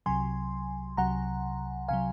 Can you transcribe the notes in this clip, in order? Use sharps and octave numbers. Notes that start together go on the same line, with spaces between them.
C2 C3 F#3 G#5 C6
C2 C3 F#3 F#5 A#5
C3 F#3 F5 G#5